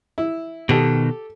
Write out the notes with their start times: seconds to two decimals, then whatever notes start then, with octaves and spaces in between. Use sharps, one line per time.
0.18 E4
0.69 B2 D#3 G4 A4